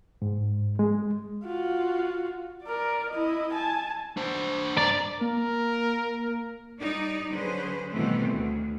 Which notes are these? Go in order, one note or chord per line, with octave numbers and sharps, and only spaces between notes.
G#2
G#3
F4 F#4
A#4 D5
E4 D#5
G#5 A5
D4 C5
G2 D5 A#5
A#3 A#4
G3 D#4 D5
D3 F#3 C#4 G#4 B4 C5
B2 D#3 E3 G3 A3 C4
D2